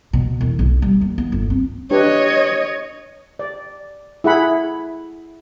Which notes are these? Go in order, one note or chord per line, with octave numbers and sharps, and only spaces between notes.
B2
E1
B1
G3
D#2
B3
G1
C4
D4 G4 B4 C#5 D#5
D5
E4 G#4 F#5 B5